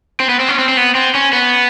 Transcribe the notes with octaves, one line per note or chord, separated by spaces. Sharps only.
C4
B3
C4
C#4
C4
C4
B3
C4
C#4
B3